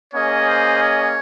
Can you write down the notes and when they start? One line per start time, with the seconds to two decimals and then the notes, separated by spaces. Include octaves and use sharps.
0.13 A#3 C#4 G#4 C#5 D#5
0.48 C5
0.82 C#5